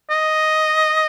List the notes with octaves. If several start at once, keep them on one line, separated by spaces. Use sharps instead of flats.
D#5